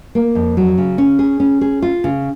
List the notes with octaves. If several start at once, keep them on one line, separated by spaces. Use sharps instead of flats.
A#3
F2
F#3
C#3
C#4
G#4
C#4
G#4
F4
C#3